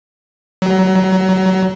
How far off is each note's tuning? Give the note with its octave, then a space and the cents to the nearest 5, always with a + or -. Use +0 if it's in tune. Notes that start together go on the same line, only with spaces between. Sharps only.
F#3 +25